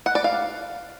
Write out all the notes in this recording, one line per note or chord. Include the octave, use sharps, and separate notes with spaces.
F#5
D5
F5